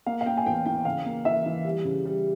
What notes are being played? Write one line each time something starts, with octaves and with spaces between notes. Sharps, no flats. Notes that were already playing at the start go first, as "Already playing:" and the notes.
A#3 F5
F5
A#3 G5
G#5
E2 G5
E3 G5
C#3 F5
A#3
E3 E5
E3
G3
C#3
G3